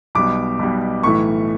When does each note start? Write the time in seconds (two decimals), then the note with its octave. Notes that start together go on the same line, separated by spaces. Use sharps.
0.15 B1 B2 G3 D6
0.59 B1 B2 G3
1.03 B1 A2 E3 A3 C#6